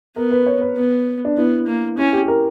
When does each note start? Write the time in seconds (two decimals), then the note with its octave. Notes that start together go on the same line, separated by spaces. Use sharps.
0.16 B3 A#4
0.31 B4
0.46 C#5
0.61 B4
0.76 B3
1.25 D4
1.37 B3 E4
1.67 A#3
1.98 C#4 E4
2.13 G4
2.23 G4
2.28 A#4